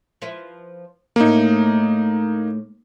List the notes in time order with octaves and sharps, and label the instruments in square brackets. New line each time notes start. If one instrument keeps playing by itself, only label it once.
[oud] F3 E4 B4
[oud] A2 A3 E4 [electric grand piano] A#3 D#4